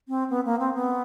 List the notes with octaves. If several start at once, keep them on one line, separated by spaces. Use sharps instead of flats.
C4
B3
A#3
C4
B3